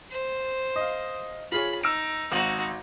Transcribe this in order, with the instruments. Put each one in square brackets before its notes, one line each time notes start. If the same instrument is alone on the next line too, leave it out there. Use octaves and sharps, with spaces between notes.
[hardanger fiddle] C5
[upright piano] D#5 F5
[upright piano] F4 G#4 C#5 [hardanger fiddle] B5
[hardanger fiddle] D#4 [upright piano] E6 D7
[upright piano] G#1 F#7 [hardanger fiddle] D#4 F#4